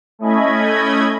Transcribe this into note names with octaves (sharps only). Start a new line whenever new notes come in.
A3 C#4 E4 D#5 B5 G#6